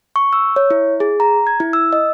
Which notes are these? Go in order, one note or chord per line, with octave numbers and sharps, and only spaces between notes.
C#6
E6
C#5
E4
G#4
A#5
G#6
E4
E6
D#5